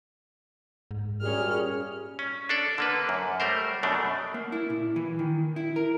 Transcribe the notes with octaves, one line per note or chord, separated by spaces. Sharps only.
G#2
F#2 A#2 G3 C#4 G#4 F6
C#4
D4 A4 D5
D3 A#3 B4
F#2
G3 A3 A#4 C5
F#2 B2 A3 D4
A#3
E4
A#2
E3
D#3
E4
A#4